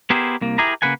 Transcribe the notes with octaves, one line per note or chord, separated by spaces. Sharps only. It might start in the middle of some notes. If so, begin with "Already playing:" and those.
B3 E4 G4 G#4 A#4 C5
C2 A#3
E4 G4 G#4 A#4 A#5
C#3 A#3 B4 F#5 G#5